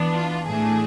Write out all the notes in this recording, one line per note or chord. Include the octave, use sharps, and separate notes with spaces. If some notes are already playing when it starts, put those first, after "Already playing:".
Already playing: E3 B3 D4
F4
A2 E3 A3 D4 G#4